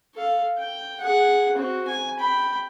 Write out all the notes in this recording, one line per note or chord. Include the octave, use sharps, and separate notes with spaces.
A4 F5
G5
G#4 F#5
C4 F#4
G#5
G5 B5